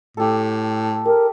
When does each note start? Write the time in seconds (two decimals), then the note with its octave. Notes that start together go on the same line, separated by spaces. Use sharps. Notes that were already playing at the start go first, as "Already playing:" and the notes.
0.17 A2 G4 A4
1.05 G4 A#4